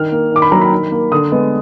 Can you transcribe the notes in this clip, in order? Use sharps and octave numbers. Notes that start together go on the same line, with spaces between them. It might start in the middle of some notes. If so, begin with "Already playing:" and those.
Already playing: D#3 F6
A#3
D#3 D6
B5
F#3 A#3 A#5
B5
D#3
A#3
D3 D#6
G#3 B3